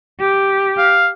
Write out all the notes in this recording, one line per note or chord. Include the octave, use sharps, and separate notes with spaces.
G4
F5